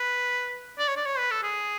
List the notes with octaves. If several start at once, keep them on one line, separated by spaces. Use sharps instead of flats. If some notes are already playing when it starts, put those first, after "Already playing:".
Already playing: B4
D5
C#5
D5
C#5
B4
A4
G#4